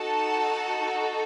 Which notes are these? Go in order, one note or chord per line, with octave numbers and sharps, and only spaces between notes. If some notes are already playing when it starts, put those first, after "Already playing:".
Already playing: D#4 F#4 A4 A5